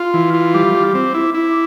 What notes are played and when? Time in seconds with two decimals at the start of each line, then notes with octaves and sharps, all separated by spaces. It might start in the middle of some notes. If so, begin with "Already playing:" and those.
Already playing: F4 C6
0.14 E3
0.34 F4
0.54 G3 D6
0.74 G3
0.94 C4
1.14 E4
1.34 E4